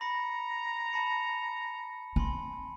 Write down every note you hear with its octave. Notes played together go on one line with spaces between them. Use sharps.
A#5 B5 A#6 C#7
A5 B5 C#7
C4 G#5 B5 C6